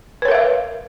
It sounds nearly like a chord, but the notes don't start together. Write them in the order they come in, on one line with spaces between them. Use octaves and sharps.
B4 C#5 A#4 E5 F5